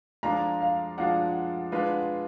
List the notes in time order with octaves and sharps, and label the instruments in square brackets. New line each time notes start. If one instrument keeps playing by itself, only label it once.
[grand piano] F3 G#3 D4 F4 [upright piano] A#5
[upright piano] F5
[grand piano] F3 G#3 D4 F4 [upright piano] F#5
[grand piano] G#3 D4 F4 B4